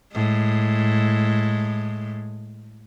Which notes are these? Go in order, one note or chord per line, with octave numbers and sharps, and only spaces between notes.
A2 G#3